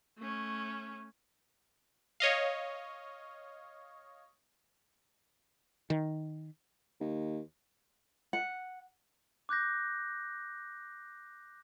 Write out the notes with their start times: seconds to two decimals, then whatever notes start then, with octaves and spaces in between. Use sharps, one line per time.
0.18 A3 C#4
2.20 C#5 D#5 F5
5.90 D#3
7.01 D#2
8.33 F#5
9.49 D6 F#6 G6 A#6